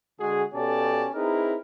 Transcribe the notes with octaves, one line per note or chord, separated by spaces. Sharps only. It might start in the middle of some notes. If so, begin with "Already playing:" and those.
D3 G#3 F#4 G#4
B2 C#4 G4 A4 D5 A5
C4 D#4 E4 G#4 A#4 B4